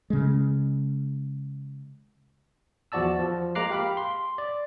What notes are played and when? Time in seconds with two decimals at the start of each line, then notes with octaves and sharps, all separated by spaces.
0.10 C#3 G#3
2.92 E2 F3 F#4 D5 A5 E6
3.19 F3
3.55 G#3 A#3 A#5 D6 F#6 C7
3.70 G4 F5 B5 D6
3.97 C6
4.38 D5